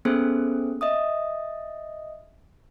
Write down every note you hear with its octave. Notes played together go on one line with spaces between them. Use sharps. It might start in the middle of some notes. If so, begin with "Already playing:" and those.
A#3 B3 C#4 G#4 A4 C5
D#5 E5 D#6